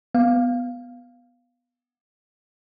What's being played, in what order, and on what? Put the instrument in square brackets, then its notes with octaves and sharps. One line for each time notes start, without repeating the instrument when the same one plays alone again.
[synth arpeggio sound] B3 F5